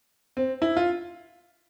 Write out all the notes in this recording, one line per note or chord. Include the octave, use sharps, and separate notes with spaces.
C4
E4
F4